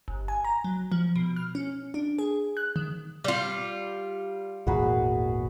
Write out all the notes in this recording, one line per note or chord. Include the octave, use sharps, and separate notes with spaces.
G1
G#5
A#5
F#3
F3
B2
F6
C#4
D4
G#4
F#6
D#3
G3 F4
G#1 E2 A#2 F#4 G#4 B4